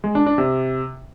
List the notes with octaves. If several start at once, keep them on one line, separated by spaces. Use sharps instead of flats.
G#3
D4
D4
C3